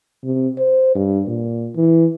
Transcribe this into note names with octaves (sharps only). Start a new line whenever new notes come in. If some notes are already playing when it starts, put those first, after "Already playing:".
C3
C5
G2
A#2
E3